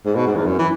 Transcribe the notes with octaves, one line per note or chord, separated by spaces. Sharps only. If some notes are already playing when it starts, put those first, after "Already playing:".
G#2
B2
G#2
E2
F#2
E3